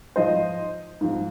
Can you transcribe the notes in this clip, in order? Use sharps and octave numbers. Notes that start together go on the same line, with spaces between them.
G#2 F3 C5 D#5
G#2 F3